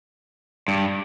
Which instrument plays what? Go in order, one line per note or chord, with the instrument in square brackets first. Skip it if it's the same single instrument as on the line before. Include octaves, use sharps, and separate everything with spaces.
[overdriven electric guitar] G2